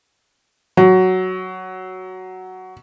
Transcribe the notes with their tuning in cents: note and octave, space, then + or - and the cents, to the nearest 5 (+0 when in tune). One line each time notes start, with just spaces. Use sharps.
F#3 +5